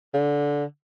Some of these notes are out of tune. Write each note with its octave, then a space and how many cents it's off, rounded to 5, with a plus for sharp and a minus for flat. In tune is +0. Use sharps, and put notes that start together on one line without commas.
D3 -15